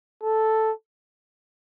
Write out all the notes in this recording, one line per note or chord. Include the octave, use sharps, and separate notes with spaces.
A4